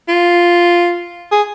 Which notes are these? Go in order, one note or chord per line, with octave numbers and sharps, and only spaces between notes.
F4
G#4